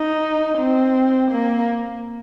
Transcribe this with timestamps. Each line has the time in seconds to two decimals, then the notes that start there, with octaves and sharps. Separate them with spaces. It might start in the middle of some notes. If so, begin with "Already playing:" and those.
Already playing: D#4
0.58 C4
1.31 A#3